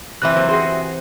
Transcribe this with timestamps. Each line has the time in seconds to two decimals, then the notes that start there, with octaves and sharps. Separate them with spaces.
0.22 C3 E3 C4 E5 F#6
0.36 F#3 A#3 C5
0.49 F#4 G#4 C5